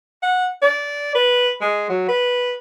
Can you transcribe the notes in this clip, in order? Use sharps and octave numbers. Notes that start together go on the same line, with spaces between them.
F#5
D5
B4
G#3
F#3
B4